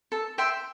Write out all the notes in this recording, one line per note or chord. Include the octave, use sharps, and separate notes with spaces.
A4
E5 G5 C6